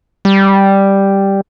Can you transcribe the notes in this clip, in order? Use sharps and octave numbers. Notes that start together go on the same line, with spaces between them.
G3